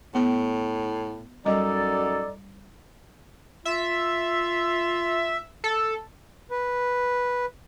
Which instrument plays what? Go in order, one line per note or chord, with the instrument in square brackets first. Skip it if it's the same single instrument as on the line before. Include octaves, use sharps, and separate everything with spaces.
[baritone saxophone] A2 [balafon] B3
[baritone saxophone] F#2 [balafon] G3 D#5 [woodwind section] D#4 A4 D5
[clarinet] F4 [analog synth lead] E5
[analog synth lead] A4
[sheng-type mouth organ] B4